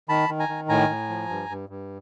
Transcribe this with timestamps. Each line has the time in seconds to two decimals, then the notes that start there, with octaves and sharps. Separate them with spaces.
0.09 D#3 A5 B5
0.29 D#3
0.39 G#5 A#5
0.49 D#3
0.69 A2 G#5 A#5
0.89 A2
1.09 F3
1.29 G2
1.49 G2
1.69 G2